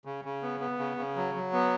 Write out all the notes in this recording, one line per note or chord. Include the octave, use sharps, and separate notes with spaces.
C#3
C#3
B3
B3
C#3
C#3
F#3
F#3
B3